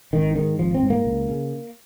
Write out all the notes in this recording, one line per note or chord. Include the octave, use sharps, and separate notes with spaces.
G#1 D#3
G#2 D#3
G#1 F3
C4
G#2
A#3
C#2
C#3